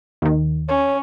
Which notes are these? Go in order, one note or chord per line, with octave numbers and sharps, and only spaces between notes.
D#2 D#3
C#4 C#5